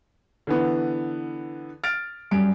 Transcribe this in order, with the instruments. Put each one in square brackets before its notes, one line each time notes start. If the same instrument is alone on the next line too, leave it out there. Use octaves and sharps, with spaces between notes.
[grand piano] D3 E3 B3
F6 A6 D7
[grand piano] F#2 D7 [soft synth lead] G3